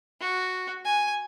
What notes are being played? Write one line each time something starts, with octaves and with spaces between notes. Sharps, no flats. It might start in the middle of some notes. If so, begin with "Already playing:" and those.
F#4
G#5